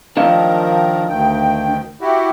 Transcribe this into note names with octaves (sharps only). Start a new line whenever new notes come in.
D#3 F3 D4 A#4 D#5 F5
D2 D#3 G5
E4 F#4 G4